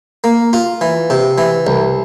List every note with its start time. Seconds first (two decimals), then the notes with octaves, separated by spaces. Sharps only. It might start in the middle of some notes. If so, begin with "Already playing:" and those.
0.24 A#3
0.53 F4
0.81 E3
1.10 C3
1.38 E3
1.67 C2